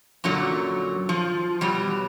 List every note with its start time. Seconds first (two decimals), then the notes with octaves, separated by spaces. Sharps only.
0.24 F#2 A#2 D3 F#3
1.09 F3
1.61 B2 F#3 G3